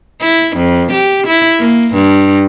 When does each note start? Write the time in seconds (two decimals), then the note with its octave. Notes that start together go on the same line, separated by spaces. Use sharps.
0.22 E4
0.57 F2
0.92 G4
1.27 E4
1.59 A#3
1.94 G2